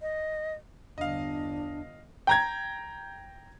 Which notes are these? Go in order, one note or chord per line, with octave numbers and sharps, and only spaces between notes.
D#5
G1 E2 D4 D#5 F5
G5 A#5 G#6